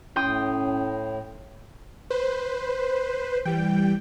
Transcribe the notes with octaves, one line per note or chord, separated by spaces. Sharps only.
A2 C#4 G5 C6 D#6
B4 C5
E3 G3 G5